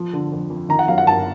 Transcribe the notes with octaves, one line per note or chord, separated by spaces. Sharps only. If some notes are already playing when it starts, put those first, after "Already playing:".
Already playing: F3
D3
F2
F2
D#3 A#5
F#5
F#2 F5
F#5
G1 A5